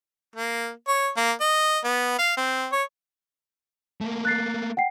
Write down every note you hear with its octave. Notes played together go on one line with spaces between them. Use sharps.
A#3
C#5
A#3
D#5
B3
F5
C4
C#5
A3 A#3
F#6 A6 C7
F#5 G5 C7